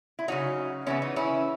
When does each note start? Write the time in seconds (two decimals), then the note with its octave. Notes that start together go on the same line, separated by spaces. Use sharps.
0.19 E4
0.28 C#3 F#3 C#4 D#4 F#4
0.87 C#3 E3 B3 C#4 E4
1.02 D#4
1.16 C#4 E4